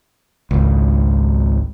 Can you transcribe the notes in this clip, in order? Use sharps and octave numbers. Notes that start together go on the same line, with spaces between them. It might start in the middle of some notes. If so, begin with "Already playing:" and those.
G#1 C#2